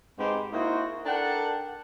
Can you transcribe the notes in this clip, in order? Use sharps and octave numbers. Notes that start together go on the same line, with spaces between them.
G#2 C4 D#4 G4 B4 C5
A#3 D#4 E4 F#4 G#4 C5
D4 A4 A#4 F#5 G5 A5